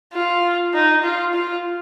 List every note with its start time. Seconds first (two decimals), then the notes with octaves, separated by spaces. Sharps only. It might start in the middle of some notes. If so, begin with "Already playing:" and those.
0.14 F4
0.74 D#4
1.03 F4
1.34 F4